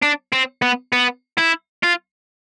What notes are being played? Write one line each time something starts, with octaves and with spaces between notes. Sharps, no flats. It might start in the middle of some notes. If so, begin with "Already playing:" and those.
D4
C4
B3
B3
E4
F4